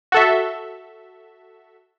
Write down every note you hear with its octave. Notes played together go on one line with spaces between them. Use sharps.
F#4 A4 E5